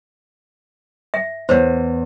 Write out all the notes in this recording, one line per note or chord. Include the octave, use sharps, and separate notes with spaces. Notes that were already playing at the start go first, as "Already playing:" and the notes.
E5
E2 C5 C#5